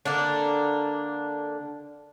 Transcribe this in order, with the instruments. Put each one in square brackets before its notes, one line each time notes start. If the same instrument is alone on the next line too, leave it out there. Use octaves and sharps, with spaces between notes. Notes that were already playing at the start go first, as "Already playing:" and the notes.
[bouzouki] D3 A#3 D4